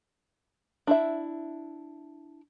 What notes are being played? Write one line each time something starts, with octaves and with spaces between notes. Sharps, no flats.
D4 E4 E5